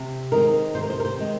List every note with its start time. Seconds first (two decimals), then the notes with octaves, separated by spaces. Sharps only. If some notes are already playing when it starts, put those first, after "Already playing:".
Already playing: C3
0.32 D#3 G#3 C4 A#4
0.75 C3 C5
0.83 A#4
0.90 C5
1.00 A#4
1.05 C5
1.18 D#3 G#3 C4